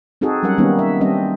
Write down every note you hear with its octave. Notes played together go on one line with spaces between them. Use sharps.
C4 D#4 F#4 G#4 A4
F#3 G3 C#4 A#4 F#5
D#3 G3 A#3 B3 C#4 D#4
E5
G3 C4 D4 D#5 E5